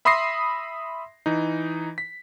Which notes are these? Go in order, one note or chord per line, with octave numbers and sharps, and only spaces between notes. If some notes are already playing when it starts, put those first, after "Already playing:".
E5 B5 C6 D#6 A#6 C7
E3 D#4
B6